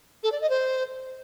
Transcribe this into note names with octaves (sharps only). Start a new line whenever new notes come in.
A4
D5
D#5
C5